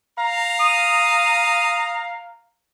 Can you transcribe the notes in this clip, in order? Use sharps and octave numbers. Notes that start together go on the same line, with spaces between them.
F5 A#5
D#6